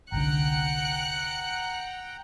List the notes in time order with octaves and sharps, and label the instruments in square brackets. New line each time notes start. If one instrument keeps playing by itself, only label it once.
[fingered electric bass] G1 C2 D3 [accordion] F#5 G5 A#5 [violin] F#6 C#7